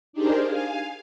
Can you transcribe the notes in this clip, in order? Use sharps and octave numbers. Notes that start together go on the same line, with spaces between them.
D4 D#4 G4 G#4 A#4 C5
F5 G#5